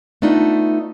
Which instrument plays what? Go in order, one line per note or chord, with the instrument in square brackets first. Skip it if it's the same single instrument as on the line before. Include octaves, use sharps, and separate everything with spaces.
[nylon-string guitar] A3 B3 D4 D#4 F4